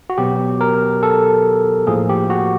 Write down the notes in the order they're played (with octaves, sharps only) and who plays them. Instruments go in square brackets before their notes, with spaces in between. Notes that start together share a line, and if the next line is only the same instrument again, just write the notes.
[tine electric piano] F#4
B2 F#3 B3 G4
A#4
A4
A2 F3 A#3 G#4
G4
F#4